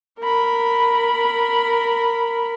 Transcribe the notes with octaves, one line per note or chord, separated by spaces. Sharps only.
A#4 B5